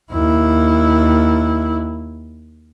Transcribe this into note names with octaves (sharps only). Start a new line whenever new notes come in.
D#2 E4